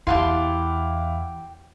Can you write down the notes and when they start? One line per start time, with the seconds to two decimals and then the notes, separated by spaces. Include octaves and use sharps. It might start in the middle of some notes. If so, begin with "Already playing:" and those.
0.07 E2 E4 G4 F5 F#5 A5 C6